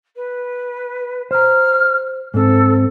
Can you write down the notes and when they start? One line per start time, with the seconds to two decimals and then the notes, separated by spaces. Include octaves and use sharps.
0.16 B4
1.31 C5 A#5 F6
2.34 G#2 C4 A4